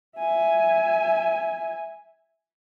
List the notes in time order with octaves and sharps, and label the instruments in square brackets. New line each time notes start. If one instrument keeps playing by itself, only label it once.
[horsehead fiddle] E5 G#5